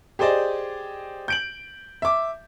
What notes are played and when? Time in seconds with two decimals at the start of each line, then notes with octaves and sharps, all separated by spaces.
0.19 G4 G#4 C5 D5 D#5
1.28 G6 D7 F#7
2.02 E5 D6